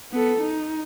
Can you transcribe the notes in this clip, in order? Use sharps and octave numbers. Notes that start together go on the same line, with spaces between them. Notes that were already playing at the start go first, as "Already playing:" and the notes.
B3 A4
D#4